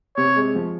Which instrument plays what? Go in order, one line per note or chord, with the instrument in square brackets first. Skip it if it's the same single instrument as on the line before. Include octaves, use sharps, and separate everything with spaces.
[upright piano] C3 [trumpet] C#5
[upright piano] G#3
F3